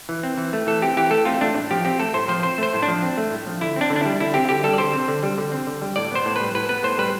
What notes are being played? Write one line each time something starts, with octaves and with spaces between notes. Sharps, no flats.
E3
C4
E3
A3
E3 A4
C4 G4
E3 G4
A3 A4
C4 F4
A3 D4
A2
F3 G4
C4 G4
A3 A4
A2 C5
F3 C5
C4 C5
A3 C5
A2
D4
F3
C4
A3
A2
F3
D3 E4
C4 D4
D3
D4
G3 E4
D3 E4
C4 G4
D3 G4
G3 A4
D5
D3 C5
C4
D3
G3
D3
C4
D3
G3
A2 D5
B3 C5
A2
G3 B4
A2 B4
B3 B4
A2 C5
G3 B4